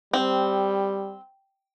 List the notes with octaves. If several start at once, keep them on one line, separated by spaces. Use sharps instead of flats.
G3 C4